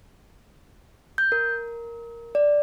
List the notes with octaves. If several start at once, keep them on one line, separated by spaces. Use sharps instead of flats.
G6
A#4
D5